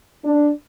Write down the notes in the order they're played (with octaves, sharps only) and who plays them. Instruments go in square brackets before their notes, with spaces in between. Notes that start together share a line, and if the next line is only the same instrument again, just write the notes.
[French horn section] D4